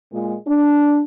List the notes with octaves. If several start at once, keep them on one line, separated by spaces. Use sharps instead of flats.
A#2 G#3
D4